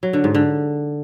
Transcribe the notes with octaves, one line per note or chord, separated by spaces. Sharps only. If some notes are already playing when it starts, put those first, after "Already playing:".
F#3
D3
G#2
D3